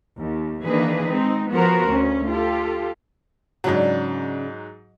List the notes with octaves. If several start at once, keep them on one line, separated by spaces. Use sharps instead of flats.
D#2
D#3 E3 A#3 D4 G#4 B4
G#3 C4 D#4
F3 B3 F#4 A#4 C5
D2 C#4
F4 G4 A4
G#2 C#3 F#3 C#4 D4